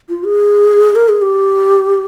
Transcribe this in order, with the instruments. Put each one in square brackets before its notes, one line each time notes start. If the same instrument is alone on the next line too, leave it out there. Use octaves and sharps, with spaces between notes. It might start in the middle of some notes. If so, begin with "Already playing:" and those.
[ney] F4
G#4
A#4
G#4
G4